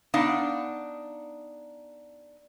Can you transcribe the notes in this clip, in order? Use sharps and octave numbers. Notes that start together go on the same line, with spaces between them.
B3 D4 D#4 F5